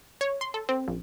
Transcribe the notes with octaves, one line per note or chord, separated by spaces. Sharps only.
C#5
C6
A4
C4
A#1